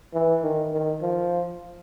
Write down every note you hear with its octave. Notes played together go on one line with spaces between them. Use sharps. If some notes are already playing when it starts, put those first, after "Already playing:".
E3
D#3
D#3
F3